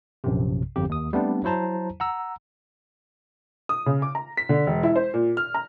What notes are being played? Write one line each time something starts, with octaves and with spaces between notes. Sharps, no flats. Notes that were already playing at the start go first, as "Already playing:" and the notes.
A#1 F#2 C3
G1 F2 G4
D#2 D#6
G3 A3 B3 C4 D4
F#3 E4 C5 A5 A#5
F#5 A#5 E6
D#6
C#3
D6
A#5
B6
D3
E1
E4
C5
A#2
F6
A#5